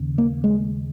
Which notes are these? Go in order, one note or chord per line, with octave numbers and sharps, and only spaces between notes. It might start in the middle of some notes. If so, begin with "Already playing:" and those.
Already playing: D#2 C#3
A#3
G#3